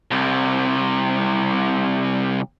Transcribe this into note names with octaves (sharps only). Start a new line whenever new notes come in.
C2 C3